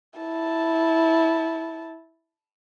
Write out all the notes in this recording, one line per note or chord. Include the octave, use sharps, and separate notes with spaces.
E4 A5